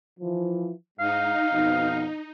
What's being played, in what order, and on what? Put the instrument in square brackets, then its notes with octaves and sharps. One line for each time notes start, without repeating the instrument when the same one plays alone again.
[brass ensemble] E3 F3
[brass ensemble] G#2 [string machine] D#4 [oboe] F5
[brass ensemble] F2 B2